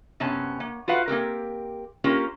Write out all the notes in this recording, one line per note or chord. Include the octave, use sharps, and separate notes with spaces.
F#2 C3 B3 C#4 A5
A#3
F4 F#4 B4 F5 F#5
A#3 C4 G4 A#4
A#3 C#4 F4 G4 A#4